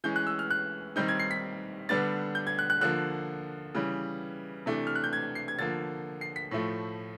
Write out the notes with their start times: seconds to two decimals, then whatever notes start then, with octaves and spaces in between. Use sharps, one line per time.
0.04 E3 G#3 C#4 G6
0.16 F#6
0.27 E6
0.39 F6
0.50 F#6
0.96 D#3 G3 C4 D#4 G6
1.08 G#6
1.20 C7
1.31 B6
1.89 D3 G3 B3 D4 A6
2.35 G6
2.47 G#6
2.59 F#6
2.70 F#6
2.81 D3 F3 A#3 F#6
3.75 C#3 E3 G3
4.66 C3 E3 A3 D4
4.87 F6
4.95 F#6
5.04 G6
5.13 G#6
5.35 C7
5.48 G#6
5.59 D3 F3 A#3 A6
6.21 C7
6.36 B6
6.51 A2 F3 A3